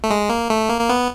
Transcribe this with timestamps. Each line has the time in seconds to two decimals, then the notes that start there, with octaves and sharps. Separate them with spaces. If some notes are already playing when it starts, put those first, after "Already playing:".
0.04 A3
0.10 G#3
0.30 A#3
0.50 A3
0.69 A#3
0.81 A#3
0.89 B3